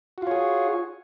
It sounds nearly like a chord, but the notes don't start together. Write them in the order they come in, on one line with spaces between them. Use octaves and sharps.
F#4 F4 C#5 G#4